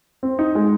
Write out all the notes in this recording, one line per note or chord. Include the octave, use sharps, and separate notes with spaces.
C4
D#4
G#3